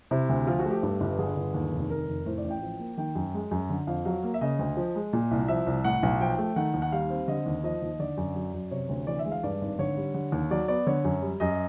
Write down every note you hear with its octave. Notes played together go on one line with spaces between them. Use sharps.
C3 E4
D2
F3 F4
F#4
A3
G4
G2 G4
G1
D3 G#4
G1
D#2
F1
D#3 A#4
F1
A2 C5
D5
A1
G5
F3
A#3
D#3 G5
F#2
G#3
F#2
D3
F2 F5
F#3 F5
A#3
E5
C#3 D#5
D2
F3
G#3
A#2
C2
F3 E5
C2
A2 F#5
B1
F3 G5
A3
D#3 F#5
D#2
F#5
G3 F5
C4
D3 D#5
D#2
F3 D#5
D#2
D3 D5
F#2
F#3
F#2
C3 C#5
D2
E3 D5
E5
G#3
F5
G2 D5
G#1
D3 C#5
G3
D3
D#2
F#3 D5
B3 D5
D3 C#5
F#2
G3
F#2 D#5